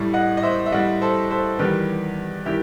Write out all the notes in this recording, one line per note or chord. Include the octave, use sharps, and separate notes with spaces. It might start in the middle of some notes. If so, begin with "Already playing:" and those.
Already playing: A2 G3
D#5 F#5
D#5
C5 E5
E5
A2 G3 D#5 F#5
A4 C5
A4 C5
E2 D#3 G3 G4 B4
D#3 G3 E4 G4